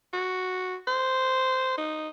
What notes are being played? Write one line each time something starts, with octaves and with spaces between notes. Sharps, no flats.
F#4
C5
D#4